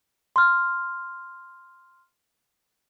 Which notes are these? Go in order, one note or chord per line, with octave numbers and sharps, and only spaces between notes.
C6 F6